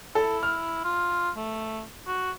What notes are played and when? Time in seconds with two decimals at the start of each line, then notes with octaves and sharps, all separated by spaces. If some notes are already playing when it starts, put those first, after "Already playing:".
0.15 E4 A4
0.43 F6
0.85 F4
1.37 A3
2.07 F#4